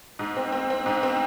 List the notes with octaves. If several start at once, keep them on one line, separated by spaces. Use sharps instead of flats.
G#2
C4
C4
C4
G#2
C4